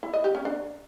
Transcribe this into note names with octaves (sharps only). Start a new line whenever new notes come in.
E4
D#5
G4
C#4
D4